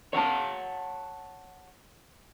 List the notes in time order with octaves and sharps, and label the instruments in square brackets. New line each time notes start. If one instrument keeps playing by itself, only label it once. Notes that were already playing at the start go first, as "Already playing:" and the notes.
[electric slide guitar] C#5 F#5 G#5 A5